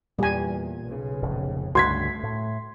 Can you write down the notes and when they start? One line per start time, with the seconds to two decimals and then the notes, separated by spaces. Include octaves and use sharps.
0.19 E2 A#2 G3 G#5
0.86 B1 C#3
1.23 F1 A#1
1.75 C#2 G2 D3 A3 F#4 C6 G#6 B6
2.23 A2